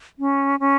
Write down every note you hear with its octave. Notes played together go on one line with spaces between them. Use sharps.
C#4
C#4